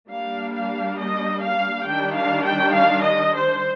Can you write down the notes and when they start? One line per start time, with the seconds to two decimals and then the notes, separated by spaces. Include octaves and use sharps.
0.10 G3 A#3 D4 F5
0.55 F5
0.99 D#5
1.43 F5
1.87 D#3 G3 D4 G5
2.16 F5
2.46 G5
2.74 F5
3.04 D#5
3.34 C5